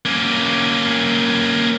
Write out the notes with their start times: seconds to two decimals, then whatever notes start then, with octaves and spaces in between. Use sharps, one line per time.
0.05 A#3 C#4